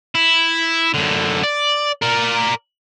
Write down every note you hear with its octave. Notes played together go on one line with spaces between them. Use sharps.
E4
F#2 D3
D5
A#4 D5